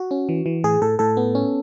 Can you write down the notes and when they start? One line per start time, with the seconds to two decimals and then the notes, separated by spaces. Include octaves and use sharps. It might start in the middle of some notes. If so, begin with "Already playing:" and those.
Already playing: F#4
0.11 C#4
0.29 E3
0.46 E3
0.64 A2 G#4
0.82 A2 A4
0.99 A2 A4
1.17 B3
1.35 C#4